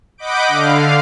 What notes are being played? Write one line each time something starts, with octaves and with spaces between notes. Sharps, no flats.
D#5 F#5 B5 D6 G6 D7
D3 F5